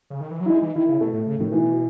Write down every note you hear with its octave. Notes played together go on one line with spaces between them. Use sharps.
C#3
D#3
E3
F#3
E4
G#3 D#4
E3
D#3 E4
C#3
B2 A3
A2
C#3
A2 D#3
B2 E3